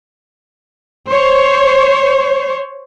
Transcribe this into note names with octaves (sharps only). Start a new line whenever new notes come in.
C5 C#5